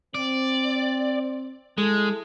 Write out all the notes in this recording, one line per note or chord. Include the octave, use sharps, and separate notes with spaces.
C4 D5
G#3 A3 E4 A4